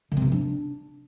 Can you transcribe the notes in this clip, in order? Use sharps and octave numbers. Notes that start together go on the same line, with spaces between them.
D3
C4
C3
F3
D4